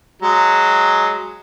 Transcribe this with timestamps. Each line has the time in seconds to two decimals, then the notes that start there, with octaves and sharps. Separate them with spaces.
0.22 F#3 G#3